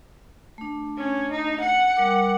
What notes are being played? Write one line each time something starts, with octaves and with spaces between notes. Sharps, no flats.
A3 D4
C#4
D#4
F#5
G3 A#4 D6